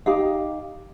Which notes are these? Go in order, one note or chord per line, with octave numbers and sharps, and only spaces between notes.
D#4 G4 F5